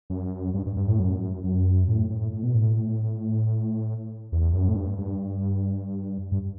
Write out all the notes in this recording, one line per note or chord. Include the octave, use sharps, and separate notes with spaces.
F#2
G2
G2
G2
A2
F#2
F#2
A2
A2
A2
B2
A2
E2
F#2
A2
G2
G2
G2